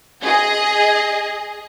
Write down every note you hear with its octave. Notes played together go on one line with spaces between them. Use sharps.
G#4 D#5